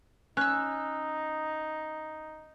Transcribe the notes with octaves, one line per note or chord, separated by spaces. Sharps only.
C#4 D#4 E6 F#6